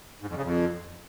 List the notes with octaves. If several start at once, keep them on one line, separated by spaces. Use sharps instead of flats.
G#2
F2
C#3
F2